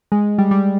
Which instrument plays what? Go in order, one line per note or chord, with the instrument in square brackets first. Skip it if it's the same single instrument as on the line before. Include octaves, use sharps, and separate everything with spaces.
[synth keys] G#3
G3
G3